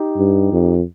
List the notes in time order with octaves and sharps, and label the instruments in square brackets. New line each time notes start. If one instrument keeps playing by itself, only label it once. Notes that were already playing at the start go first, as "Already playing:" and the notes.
Already playing: [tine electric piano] D#4 G4
[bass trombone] G2
F2